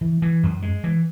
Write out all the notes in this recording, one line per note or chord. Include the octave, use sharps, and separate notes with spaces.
E3
E3
F#2
G#3
E3